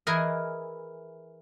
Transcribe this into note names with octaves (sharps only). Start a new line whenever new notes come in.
E3 E4 G#4 A#4 D#5